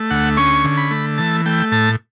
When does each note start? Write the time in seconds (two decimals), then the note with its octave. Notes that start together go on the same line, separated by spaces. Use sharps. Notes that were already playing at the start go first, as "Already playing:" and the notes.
Already playing: A3
0.10 D2 F#5
0.37 C#4 C#6
0.64 D3
0.77 B5
0.91 A3
1.18 E3 A5
1.46 A3 G5
1.72 A2 A5